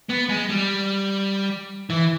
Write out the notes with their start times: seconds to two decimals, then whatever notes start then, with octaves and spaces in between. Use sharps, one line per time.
0.10 B3
0.29 G#3
0.49 G3
1.90 E3